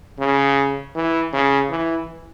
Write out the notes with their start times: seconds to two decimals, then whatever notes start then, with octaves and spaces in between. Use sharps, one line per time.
0.19 C#3
0.95 E3
1.33 C#3
1.70 E3